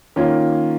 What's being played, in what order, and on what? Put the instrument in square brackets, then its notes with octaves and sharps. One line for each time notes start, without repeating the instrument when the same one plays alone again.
[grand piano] D#3 A#3 C#4 F4